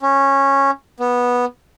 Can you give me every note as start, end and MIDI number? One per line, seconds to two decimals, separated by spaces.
0.01 0.71 61
1.00 1.45 59